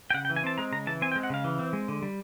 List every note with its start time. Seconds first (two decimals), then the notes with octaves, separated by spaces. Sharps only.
0.10 G5
0.14 C#3 F#5
0.25 G5
0.30 E3
0.36 G#5
0.43 C4 A5
0.58 G#3 A#5
0.72 C#3 A#5
0.87 E3 A5
1.02 C4 G#5
1.12 G5
1.16 G#3
1.23 F#5
1.30 C#3 F5
1.44 E3
1.59 C4
1.73 G#3
1.88 D3
2.03 G3